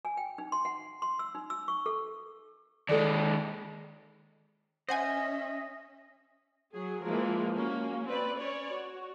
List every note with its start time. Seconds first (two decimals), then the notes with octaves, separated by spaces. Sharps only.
0.05 G#5
0.17 G5
0.38 D#4
0.52 C6
0.65 F#5
1.02 C6
1.19 E6
1.35 D#4
1.50 E6
1.68 C#6
1.86 A4
2.89 D#2 G#3 A4 D5
4.89 C#4 C5 D#5 E5 F#5 G#5
6.74 F#3 G#4
7.04 E3 F3 G#3 A#3 A#4
7.55 A#3 C#4 F#4
8.07 C4 B4 D5
8.38 C#4 C#5 D5
8.72 F#4